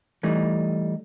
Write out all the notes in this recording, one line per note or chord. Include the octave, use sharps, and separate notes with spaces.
E3 G3 A3 D#4